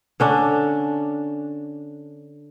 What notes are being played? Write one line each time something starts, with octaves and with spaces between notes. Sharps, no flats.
D3 C#4 D4